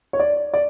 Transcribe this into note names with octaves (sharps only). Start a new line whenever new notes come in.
C#5
D5
D5